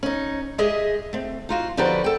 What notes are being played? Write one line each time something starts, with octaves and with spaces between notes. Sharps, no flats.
C#4 D#4
G#3 G4 G#4 D#5 E5
A3 C4
D#4 F4 F#4
D3 F3 D#4 F#4 G4 B4
A4 G5